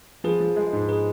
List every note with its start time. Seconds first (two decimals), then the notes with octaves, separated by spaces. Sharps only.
0.24 F3 G#4 B4
0.40 F3
0.56 G#3
0.73 G#2
0.89 G#4 B4